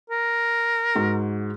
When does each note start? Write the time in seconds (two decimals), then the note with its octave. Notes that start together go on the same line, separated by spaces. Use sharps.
0.10 A#4
0.95 G#2 F#4